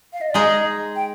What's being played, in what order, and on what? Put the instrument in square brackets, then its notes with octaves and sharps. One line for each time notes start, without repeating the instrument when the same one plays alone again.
[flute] F5
D#5
D5
[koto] G#3 D#4 G#4 [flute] D#5
[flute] G5